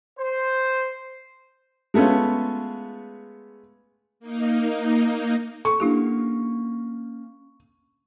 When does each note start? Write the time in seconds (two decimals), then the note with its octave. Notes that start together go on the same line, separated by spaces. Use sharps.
0.18 C5
1.94 G#3 A3 B3 C#4 F4
4.20 A#3 D#4
5.65 A4 C#6
5.80 A#3 C#4 D4 E4 G4 F#5